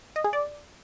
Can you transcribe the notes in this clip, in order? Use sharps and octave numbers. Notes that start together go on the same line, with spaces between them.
D#5
G#4
D5